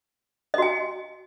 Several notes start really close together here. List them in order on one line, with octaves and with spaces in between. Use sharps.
D#5 F#4 G#5